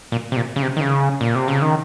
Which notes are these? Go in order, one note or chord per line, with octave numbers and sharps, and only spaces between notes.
A#2
C3
A#2
C#3
C3
D#3
C#3
A#2
C3
C#3
D#3